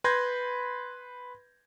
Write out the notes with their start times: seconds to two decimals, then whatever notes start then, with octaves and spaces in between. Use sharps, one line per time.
0.04 B4 B5 C6 G6 G#6 A#6